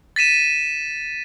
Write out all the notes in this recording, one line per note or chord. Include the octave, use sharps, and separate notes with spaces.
A6 B6 D#7 E7